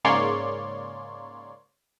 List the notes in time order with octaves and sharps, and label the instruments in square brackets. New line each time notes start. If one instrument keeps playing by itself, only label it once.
[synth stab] G#2 C#3 A#3 C#5 D5 C6